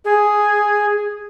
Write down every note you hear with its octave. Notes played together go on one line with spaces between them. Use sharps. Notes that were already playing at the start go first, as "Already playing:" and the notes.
G#4